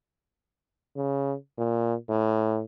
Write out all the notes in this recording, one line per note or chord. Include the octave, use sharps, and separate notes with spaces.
C#3
A#2
A2